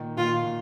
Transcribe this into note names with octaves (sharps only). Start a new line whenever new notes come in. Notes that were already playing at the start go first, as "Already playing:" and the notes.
Already playing: A#2 D#3
A#2 D#3 F4
A#2